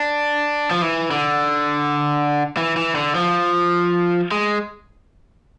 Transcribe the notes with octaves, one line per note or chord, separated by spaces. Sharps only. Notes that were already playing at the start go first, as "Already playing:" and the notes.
Already playing: D4
F3
E3
D3
E3
E3
D3
F3
G#3